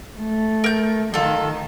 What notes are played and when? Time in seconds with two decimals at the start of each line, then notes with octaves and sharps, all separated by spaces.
0.17 A3
0.64 A#4 G6
1.14 D#3 F4 A4